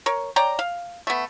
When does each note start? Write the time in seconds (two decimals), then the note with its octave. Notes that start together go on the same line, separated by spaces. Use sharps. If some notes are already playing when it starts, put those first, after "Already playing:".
0.06 A#4 C#5
0.36 C#5 D5 G5 A#5
0.59 F5
1.07 A3 B3